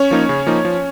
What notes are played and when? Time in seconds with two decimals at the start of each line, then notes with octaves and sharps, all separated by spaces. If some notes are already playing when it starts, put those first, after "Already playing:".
Already playing: C#4 C#5
0.11 F3 A#3 D#4
0.29 C#3
0.47 F3 A#3 D#4
0.65 F3